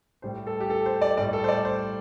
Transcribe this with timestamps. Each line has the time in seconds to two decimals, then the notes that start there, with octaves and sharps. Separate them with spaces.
0.22 A2 G3 C5
0.47 A4
0.60 G4
0.70 A4
0.86 C5
1.02 D5
1.17 A2 G3 D5
1.33 A4
1.44 C5
1.48 D5
1.65 C5